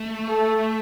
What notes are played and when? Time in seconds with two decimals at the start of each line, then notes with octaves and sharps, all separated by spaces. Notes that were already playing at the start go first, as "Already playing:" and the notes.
Already playing: A3
0.29 A4